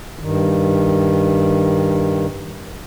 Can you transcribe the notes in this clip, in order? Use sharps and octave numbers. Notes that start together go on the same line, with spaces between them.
G2 D#3